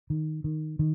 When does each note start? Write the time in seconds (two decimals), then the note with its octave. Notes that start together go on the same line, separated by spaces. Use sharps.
0.10 D#3
0.44 D#3
0.79 D#3